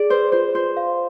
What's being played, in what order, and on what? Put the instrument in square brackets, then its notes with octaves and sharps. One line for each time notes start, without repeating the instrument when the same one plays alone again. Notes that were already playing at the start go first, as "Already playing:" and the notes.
Already playing: [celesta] G#4 [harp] D5
[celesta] B4 [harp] C5
[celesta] F4 [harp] C5
[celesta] F4 [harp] C5
[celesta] F5